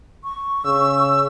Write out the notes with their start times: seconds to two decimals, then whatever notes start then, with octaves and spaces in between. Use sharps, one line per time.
0.24 C#6
0.65 C#3 E6